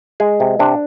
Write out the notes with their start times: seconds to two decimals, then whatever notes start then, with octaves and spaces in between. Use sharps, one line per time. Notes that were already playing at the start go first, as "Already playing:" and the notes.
0.20 G#3 G#4
0.40 C3
0.59 C3 D4